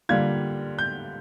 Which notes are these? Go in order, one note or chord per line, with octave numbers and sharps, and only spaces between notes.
D3 G3 A#3 F4 G#6
G6